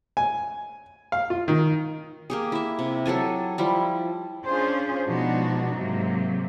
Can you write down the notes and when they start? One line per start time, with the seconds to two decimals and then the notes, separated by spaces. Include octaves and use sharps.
0.17 G#5
1.12 F5
1.30 F4
1.48 D#3
2.30 A#3 G4 G#4
2.52 E4 E5
2.79 C3
3.06 F#3 G4 A4 G#5
3.58 F3 G3 E4
4.47 C#4 D4 F4 G#4 C5
5.07 B2 F3 G#3 D4 D#4 F#4
5.72 G#2 C3 F#3 A#3